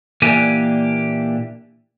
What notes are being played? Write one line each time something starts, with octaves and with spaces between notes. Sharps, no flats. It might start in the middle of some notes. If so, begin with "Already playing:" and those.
A#2 E3 A#3 D4 G4 G#5